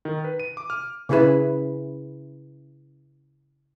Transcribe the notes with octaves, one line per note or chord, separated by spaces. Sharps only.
D#3
B4
D#7
D6
F6
C#3 C#4 E4 G#4 B4